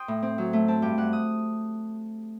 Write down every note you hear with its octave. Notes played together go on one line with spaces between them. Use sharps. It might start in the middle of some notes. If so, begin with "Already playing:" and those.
Already playing: G5 C6 D#6
A2
C4
F#3
A3
C4 A5
G2 G5
G2 F#5
D#6